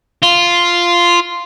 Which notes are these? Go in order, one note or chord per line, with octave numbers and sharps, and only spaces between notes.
F4